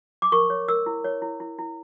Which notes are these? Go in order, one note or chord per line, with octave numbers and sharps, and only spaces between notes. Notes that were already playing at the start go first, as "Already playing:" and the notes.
D6
A#4 C#6
C#5
A#4 E6
E4
C#5
E4
E4
E4